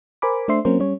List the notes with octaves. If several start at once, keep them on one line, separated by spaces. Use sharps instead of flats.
A#4 C5 G#5 B5 D6
A3 D4 C5 E5 C6 C7
F#3 A#3 C4 C#4 A#4 C5
G3 C#4 C#5